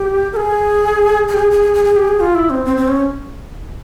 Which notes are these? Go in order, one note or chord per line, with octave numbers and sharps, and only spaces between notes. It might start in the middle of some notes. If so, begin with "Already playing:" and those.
Already playing: G4
A#4
G#4
G#4
G4
G#4
G#4
G#4
G#4
G#4
G4
G#4
F4
E4
C4
C4
C4
C#4